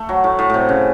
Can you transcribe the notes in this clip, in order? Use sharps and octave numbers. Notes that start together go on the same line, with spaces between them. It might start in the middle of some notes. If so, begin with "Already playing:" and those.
Already playing: A3
F#3
A2
A2
A2 C3
C#3